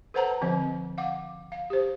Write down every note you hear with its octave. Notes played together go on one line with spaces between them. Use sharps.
A4 B4 C5 F#5 A5 A#5
D3 F3 C4 D#5
F5 F#5 D6
F5
G4 C5